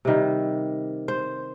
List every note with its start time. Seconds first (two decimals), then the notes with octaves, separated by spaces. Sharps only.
0.05 C3 D#3 G3
1.08 C5